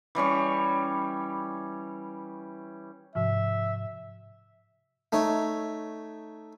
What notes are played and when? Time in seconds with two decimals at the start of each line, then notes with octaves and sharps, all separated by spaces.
0.15 E3 G3 C#4 C#6
3.15 G#2 C3 F3 E5
5.12 A3 D#4 C#5